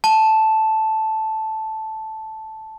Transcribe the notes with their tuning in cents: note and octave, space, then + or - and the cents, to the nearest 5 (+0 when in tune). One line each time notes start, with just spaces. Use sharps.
A5 -5